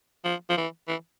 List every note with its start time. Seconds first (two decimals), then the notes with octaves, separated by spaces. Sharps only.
0.25 F3
0.50 F3
0.58 E3
0.88 E3